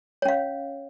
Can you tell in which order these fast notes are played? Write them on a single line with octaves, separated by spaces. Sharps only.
C#5 C#4 F5